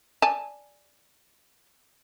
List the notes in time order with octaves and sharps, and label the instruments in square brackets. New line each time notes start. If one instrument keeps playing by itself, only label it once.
[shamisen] D5 G#5 A5